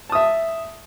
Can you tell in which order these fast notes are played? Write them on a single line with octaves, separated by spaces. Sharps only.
A5 D#6 E5